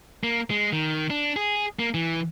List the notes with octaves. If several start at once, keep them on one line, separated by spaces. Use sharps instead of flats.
A#3
G#3
D#3
D4
G#4
A#3
E3